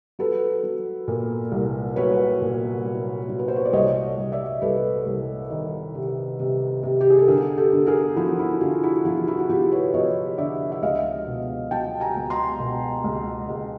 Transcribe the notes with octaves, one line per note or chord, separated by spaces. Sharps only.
F#3 A4 B4
F#3
A#2
C2
F#3 B4 C#5
A#2
F#3
F#3
B4
C5
C#5
D5
C2 C#5 D#5
C2
D5 E5
C2 A4 B4
C2
D#3
C3
C3
C3
G4
G#4
A4
D3 G#4 A#4
G4 A4
D3
G#4 A#4
F3 E4 F#4
E4
D3 F4
E4 F#4
F3 F4
E4 F#4
F#4
F3 F4 G4
B4 C#5
F3 C#5 D#5
D3 D5 E5
E5
C#2 D#5 F5
B2
F#3 G5 A5
G#5 A#5
C#2
A#5 C6
B2
C#2
C#2